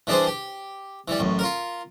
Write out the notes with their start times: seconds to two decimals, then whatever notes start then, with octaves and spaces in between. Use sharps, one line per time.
0.07 E3 G3 D4 G#4 C5
0.27 G4
1.08 E3 G3
1.19 A1 F#2
1.39 F4 A#4